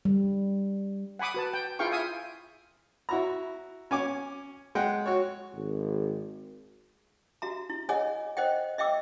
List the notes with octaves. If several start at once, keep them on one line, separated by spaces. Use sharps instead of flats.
G3
F#5 G#5 B5 D6 D#6
F#4 B4 A5
G5
E4 F4 G#4 F5 G5 C#6
E5 F5 G#5 D#6
E4 F#4 A#5
C#4 G#5 D6
G#3 F#5 G5
F#4 C#5
G#1
F#4 E5 A#5
E4
G#4 C#5 D#5 F#5 G#5
C5 D#5 F#5 G5
D#5 E5 G5 D6 E6